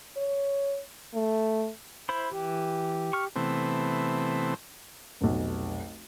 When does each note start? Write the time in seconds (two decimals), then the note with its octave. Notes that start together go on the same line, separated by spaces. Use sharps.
0.17 C#5
1.14 A3
2.09 E4 C5 B5
2.32 E3 G4
3.13 C#6 F6
3.36 C3 E3 A3 B3 C4
5.21 F1 B1